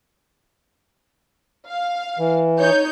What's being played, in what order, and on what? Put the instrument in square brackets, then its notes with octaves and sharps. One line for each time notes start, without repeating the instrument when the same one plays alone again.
[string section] F5
[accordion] E3
[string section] D#4 C#5 G6